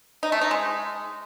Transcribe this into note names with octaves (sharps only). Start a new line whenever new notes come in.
D#4
A3
D#4
G#3